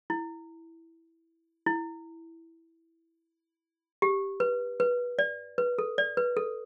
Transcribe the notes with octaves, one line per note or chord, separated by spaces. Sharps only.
E4
E4
G4
B4
B4
D5
B4
A4
D5
B4
A4